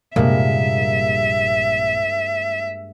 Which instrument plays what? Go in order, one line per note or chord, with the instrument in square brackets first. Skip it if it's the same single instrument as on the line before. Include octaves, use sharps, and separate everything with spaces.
[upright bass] A#1 C3 [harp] G2 G#3 A#3 [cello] E5